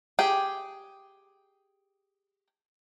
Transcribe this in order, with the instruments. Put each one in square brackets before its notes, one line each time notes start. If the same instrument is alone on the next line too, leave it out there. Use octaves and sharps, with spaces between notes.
[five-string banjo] G4 G#4